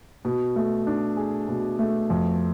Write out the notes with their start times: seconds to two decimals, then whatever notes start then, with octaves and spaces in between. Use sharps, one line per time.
0.25 B2
0.56 A3
0.87 D4
1.17 G#4
1.48 B2
1.79 A3
2.10 F2